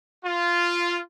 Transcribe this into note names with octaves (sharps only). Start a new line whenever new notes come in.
F4